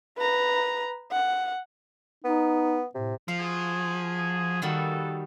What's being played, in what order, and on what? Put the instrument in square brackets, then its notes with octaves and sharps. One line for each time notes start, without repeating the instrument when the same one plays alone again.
[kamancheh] B4 A#5
F#5
[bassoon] B3 [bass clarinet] D#4
[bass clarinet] A2 [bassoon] C3
[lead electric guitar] F3 [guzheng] F5
[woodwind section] F#4 G#4
[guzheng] D#3 G3 F#4 [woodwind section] A#3 B3 A4